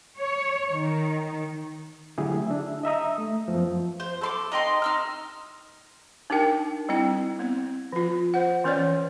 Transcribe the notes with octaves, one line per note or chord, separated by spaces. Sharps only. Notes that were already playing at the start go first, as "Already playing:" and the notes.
C#5
D#3
D3 F#3 A3 E4 G4 G#4
D4 E5
D#5 E5 A#5 D#6
A3
F#2 F3 B3 C5
C5
A4 C6 D6
D#4 D#5 G5 C6
D#4 E6 F6
D4 D#4 G4 A#4 G5
G3 C4 E4 G5
B3 C4
F3 F4
C5 F#5
E3 C#4 B4 C#5 D5